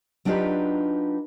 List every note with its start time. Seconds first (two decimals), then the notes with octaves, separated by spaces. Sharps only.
0.25 F#3 D4 D#4 F4 G4 B4